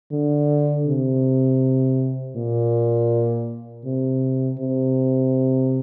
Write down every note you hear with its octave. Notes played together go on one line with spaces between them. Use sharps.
D3
C3
A#2
C3
C3